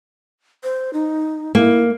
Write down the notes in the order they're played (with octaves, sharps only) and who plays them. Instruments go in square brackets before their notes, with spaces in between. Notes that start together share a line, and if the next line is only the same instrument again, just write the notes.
[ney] C5
D#4
[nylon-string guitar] A#3 [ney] E4